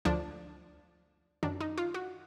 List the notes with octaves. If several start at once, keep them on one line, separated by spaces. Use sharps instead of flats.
D2 D3 F3 D4
F#2 D#3 D4
D#4
F4
F#4